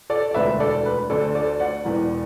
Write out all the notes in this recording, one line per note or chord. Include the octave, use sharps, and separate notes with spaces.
A4 D5
D5
E1 D2 D3 B4 E5
A4 D5
B4
D2 D3 A4 D5
A4 D5
D5 F#5
E1 E2 E3